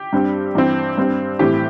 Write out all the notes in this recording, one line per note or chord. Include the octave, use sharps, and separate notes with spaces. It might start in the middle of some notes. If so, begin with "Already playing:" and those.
Already playing: G4
G2 G3 C4
G2 E3 C4
G2 G3 C4
A2 E3 C4 G4